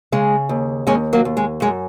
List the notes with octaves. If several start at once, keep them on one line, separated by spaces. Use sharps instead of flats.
C#3 G#3
D#2
D#2 G#3 C#4
F#3 A#3
D#2
G#3
F#2 G#3